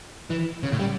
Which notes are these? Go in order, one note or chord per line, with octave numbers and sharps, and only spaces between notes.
E3
C#3
A2
G3